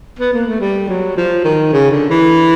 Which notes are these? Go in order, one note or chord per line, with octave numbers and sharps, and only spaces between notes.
B3
A#3
A3
G3
F#3
F3
D#3
C#3
D3
E3